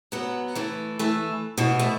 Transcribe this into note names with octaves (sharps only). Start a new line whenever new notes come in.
F#3 B3
E3 A3
E3 A3
B2 E3
A3